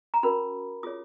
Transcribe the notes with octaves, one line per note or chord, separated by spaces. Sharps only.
A#5
C#4 F#4 A#4 B5
F4 G#4 C#5 D#6